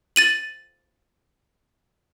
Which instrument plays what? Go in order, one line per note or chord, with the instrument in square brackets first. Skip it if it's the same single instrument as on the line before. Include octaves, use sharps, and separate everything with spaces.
[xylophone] A6 D#7 F#7